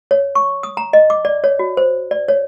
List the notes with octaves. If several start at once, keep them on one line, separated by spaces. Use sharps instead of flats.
C#5
C#6
D#6
A#5
D#5
D6
D5
C#5
F#4
C5
D5
C#5